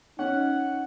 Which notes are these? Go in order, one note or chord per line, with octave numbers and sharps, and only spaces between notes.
C#4 D#4 F#5